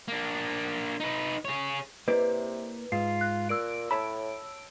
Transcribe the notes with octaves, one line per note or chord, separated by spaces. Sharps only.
A#3 D4
D#4 B4
G#4 C#5
C3 A#3 E4 B4 D5
G#2 F4 C7
F#6
A#2 E6 D7
A2 C#5 A5 B5